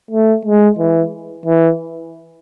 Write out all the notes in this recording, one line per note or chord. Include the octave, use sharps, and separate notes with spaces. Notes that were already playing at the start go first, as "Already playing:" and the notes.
A3
G#3
E3
E3